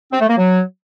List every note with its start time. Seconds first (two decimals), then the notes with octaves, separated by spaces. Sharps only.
0.13 C4
0.21 A3
0.29 A#3
0.38 F#3